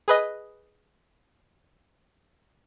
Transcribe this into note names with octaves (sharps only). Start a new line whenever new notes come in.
G#4 B4 D#5